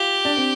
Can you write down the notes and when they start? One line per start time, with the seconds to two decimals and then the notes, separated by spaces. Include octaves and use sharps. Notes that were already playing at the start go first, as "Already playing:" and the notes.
Already playing: F4 G4
0.25 D4
0.37 C4